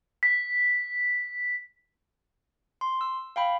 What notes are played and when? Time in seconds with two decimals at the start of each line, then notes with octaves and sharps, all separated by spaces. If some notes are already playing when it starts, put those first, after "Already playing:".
0.23 B6
2.81 C6
3.01 E6
3.36 F5 G5 B5